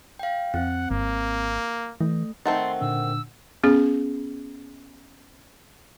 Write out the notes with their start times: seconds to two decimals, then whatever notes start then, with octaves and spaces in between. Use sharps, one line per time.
0.19 F5 G5
0.54 F2 C4 F#5
0.91 G#1 A#3
2.00 E3 A3
2.46 D#3 A3 C4 F#5 C6 A6
2.81 A#2 D3 D4 E6
3.63 B3 C#4 G#4